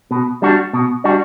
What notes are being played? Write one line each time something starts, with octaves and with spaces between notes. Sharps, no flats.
B2
G3 D4 F#4
B2
G3 D4 F#4